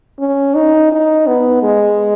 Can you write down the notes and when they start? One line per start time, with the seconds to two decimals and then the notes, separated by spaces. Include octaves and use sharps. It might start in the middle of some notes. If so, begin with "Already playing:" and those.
0.19 C#4
0.55 D#4
0.92 D#4
1.27 B3
1.63 G#3